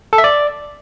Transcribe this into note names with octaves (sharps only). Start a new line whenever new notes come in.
A4
E5
D5